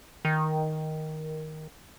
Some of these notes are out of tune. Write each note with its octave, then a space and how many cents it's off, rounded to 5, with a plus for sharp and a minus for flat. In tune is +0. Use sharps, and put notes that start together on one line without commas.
D#3 +5